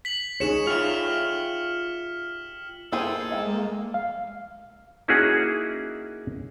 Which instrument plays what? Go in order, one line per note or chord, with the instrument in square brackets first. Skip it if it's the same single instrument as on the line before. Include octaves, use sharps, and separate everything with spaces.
[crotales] B6 F#7
[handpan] D#4 G#4 C#5 [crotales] C#7 E7
[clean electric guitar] F4 G4 E5 [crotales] F6
[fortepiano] A#3 C5 G5 [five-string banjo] E4 F4 G#4 [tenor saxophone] A4
[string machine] G#3 A#3 [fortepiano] D#5 F5 G5
[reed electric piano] F5
[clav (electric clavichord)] A#3 C#4 D#4 E4 F#4 G#4